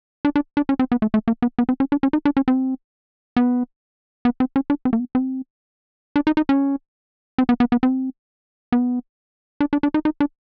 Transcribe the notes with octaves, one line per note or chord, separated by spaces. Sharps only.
D4
D4
D4
C#4
C4
B3
A3
A3
A#3
B3
B3
C4
C#4
D4
C#4
D#4
D4
C#4
C4
B3
B3
C4
C#4
D4
C4
A#3
B3
C4
D4
D#4
D#4
C#4
C4
B3
B3
B3
C4
B3
D4
D4
D4
D#4
D#4
D4